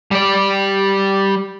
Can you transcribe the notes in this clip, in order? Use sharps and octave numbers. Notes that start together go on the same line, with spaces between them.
G3 D5